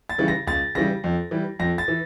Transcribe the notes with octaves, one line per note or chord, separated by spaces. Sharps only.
A6
C#3 E3 G3
A#6
C#2 A6
C#3 E3 G3 A#6
F2
E3 G3
F2 A#6
A6
E3